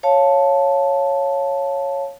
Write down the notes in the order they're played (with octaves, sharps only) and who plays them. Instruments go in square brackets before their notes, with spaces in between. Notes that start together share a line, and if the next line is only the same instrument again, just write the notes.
[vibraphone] C#5 F5 A5